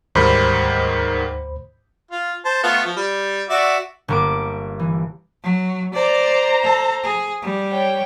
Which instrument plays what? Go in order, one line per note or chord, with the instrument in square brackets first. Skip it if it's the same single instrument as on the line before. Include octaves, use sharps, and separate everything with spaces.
[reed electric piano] D2 C5 B5 [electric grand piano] G#2 D#3 G3
[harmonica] F4
C5 A5
A3 B3 F4
F3
G3
F#4 D5 E5
[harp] G1 A#3 D6
E3
[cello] F#3
[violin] C5 A#5 [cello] D5
[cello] A4
G#4
G3
[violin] C#5 G5